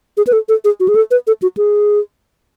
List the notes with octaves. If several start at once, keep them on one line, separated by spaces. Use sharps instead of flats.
G#4
B4
A4
A4
G#4
F#4
G#4
A4
B4
A4
F#4
G#4